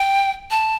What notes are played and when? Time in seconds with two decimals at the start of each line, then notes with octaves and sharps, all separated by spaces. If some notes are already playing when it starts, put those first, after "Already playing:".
Already playing: G5
0.51 A5